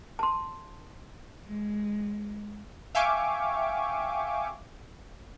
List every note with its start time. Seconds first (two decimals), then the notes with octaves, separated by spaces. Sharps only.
0.19 A5 C6
1.46 G#3
2.95 E5 F5 G5 G#5 C#6 D6